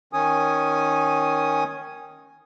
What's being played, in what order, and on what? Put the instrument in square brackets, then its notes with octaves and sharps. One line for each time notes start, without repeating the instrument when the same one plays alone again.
[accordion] D#3 C#4 G#5 D#6